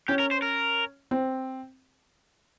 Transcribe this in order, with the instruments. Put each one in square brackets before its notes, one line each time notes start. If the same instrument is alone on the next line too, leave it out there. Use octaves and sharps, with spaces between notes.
[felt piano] C#4 [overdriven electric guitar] G4
[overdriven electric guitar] A#4
C5
A#4
[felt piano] C4